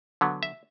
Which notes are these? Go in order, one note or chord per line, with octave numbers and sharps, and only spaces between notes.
D3 F#3 B3
E5